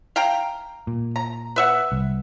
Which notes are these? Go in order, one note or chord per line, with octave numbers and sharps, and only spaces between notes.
F5 G5 A#5
A#2
A#5
B4 E5 F#5
C2